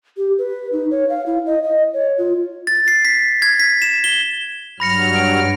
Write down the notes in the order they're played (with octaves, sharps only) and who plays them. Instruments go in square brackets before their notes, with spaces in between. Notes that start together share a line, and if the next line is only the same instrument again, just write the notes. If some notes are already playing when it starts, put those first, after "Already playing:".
[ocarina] G4
B4
D#4
C#5
F5
E4
D#5
D#5
C#5
F4
[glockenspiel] A6
C7
B6
G#6
B6
E7
G7
[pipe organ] G2 F#3 F6 [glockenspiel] B5 A#6 C#7
[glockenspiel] D7